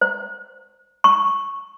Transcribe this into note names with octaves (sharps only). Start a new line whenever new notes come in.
C5
C#6